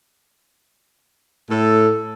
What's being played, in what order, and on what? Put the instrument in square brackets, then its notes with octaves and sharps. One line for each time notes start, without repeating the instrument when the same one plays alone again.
[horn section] A2 A4